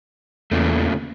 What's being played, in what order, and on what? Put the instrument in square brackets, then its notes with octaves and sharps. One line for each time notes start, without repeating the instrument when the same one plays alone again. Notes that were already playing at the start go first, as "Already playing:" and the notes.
[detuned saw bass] E2 [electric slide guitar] A#2 C#3 A3